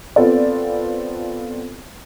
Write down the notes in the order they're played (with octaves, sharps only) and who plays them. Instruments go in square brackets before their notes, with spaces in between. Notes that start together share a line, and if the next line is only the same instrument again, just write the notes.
[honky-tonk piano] B3 C4 F4 A4 D5